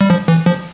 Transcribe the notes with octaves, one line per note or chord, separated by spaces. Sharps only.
G3
F3
E3
F3